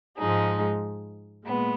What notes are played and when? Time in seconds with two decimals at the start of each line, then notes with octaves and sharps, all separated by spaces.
0.17 G#2 F3 G#3 D#4 G#4
1.45 A#2 G#3 B3